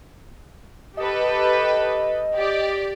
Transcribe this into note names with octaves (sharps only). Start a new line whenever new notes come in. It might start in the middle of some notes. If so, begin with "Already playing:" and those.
G4 A4 B4 D#5
G4 D5